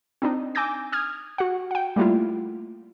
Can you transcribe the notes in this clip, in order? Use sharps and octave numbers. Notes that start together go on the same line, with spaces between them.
C4 D4 D#4
G#5 D6 E6 G6 A#6
D#6 F6 G#6
F#4 F#5
F#5 G5
G3 A3 A#3 E4 F4